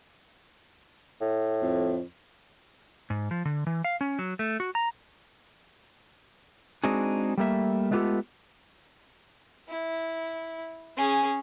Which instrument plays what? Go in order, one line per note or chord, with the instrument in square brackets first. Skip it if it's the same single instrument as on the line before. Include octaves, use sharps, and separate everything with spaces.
[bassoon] A2
[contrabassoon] F2
[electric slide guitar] G#2
F3
D3
E3
F5
C#4
F#3
A3
F#4
A#5
G#3 C4 D4 D#4 F#4 G#4
G3 A3 A#3 E5
G#3 A3 B3 F4 G4 A4
[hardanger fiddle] E4
C#4 G#4